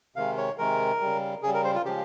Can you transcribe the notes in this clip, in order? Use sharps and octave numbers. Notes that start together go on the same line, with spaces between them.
C3 D#3 G#3 F5
C#5
C3 D#3 G#3 A#4
C#3 G3
C#3 G3 G#4
A#4
C5
F4
C#3 F3 G#3 G4